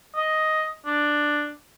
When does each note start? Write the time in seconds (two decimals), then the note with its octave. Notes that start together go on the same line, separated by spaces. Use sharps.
0.15 D#5
0.86 D4